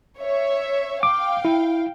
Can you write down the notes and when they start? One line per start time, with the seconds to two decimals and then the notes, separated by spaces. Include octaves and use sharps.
0.20 C#5 E5
1.03 F5 G5 D6
1.45 E4